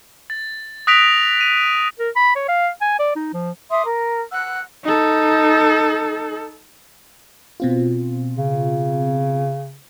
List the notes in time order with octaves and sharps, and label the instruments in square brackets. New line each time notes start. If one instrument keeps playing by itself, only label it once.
[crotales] A6
D#6 F#6 A#6 B6 D7 F7
D#7
[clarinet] A#4
B5
C#5
F5
G#5
D5
D#4
F3
[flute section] E5 C6 D6 D#6
A#4
F#5 E6 F#6
[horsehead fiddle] D#4 A4
[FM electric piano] B2 C4 F4
[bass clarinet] C#3